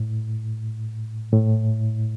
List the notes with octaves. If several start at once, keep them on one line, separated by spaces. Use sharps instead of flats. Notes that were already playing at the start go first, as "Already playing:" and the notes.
Already playing: A2
A2